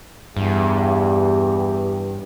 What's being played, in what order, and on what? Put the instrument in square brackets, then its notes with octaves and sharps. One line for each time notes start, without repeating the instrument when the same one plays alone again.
[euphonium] E2 [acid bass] G2 [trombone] G4